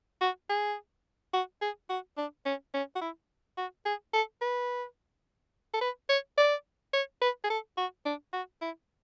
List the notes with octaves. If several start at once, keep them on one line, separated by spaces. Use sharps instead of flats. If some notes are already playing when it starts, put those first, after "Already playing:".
F#4
G#4
F#4
G#4
F#4
D4
C#4
C#4
F#4
E4
F#4
G#4
A4
B4
A4
B4
C#5
D5
C#5
B4
G#4
A4
F#4
D4
F#4
E4